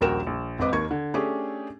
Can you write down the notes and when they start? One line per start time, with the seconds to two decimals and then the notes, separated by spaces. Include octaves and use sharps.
0.01 D#1 A#1 F#4 A#4 G5 E7
0.27 A#1
0.59 G#1 G#2 C4 B4 D#5 D6
0.72 D#2 D#3 A#3 C#6 G#6
0.91 D3
1.14 A3 C#4 D4 G4 G#4